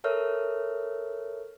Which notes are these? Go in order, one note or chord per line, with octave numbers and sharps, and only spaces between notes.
A4 A#4 C#5 E5 F6